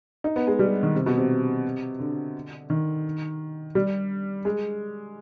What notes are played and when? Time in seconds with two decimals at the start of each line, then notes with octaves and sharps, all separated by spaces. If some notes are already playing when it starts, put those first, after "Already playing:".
0.24 D#4
0.36 B3
0.47 G#3
0.59 G3
0.83 D#3
0.95 C3
1.06 B2
1.17 C3
2.00 D3
2.70 D#3
3.75 G3
4.45 G#3